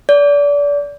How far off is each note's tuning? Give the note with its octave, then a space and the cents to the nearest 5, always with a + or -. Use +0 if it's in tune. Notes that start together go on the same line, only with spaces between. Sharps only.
D5 -30